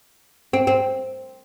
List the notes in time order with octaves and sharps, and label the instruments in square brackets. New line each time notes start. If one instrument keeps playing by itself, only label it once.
[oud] C4
C4